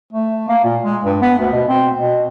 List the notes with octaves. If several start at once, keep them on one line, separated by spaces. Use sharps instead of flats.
A3
A#3
A#2
G#3
G2
B3
D2
B2
C4
B2